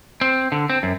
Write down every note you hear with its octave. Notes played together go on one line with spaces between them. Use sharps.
C4
D3
C4
F#2